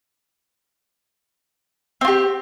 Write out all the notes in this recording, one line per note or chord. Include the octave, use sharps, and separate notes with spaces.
C4 F4 G4